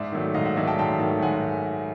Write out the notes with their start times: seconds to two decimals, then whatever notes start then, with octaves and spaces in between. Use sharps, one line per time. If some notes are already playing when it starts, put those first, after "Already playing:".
Already playing: G#2 D5 E5
0.12 D#3 F#3 A3
0.34 G#2 D#5 F5
0.45 E5 F#5
0.56 D#3 F#3 A3 D5 E5
0.67 G5 A5
0.79 G#2 G5 A5
1.00 D#3 F#3 A3
1.22 G#2 F#5 G#5